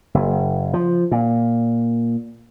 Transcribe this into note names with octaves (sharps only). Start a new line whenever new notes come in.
F#1
F3
A#2